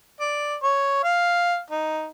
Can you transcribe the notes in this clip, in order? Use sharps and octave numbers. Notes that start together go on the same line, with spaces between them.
D5
C#5
F5
D#4